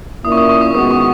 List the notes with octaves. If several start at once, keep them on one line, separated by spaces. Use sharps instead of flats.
A#2 A#3 C#4 E4 D#6
C#6
D#6
C#6
D#6
D#3 G#3 B3 F#4 D#6
C#6